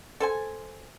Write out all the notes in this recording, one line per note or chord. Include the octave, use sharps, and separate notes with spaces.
A4 C5 G#5